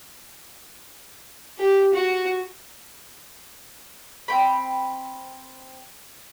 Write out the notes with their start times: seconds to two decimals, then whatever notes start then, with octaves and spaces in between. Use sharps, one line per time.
1.59 G4
1.94 F#4
4.28 C4 G5 B5